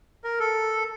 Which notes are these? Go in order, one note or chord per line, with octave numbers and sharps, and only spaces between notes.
A#4
A4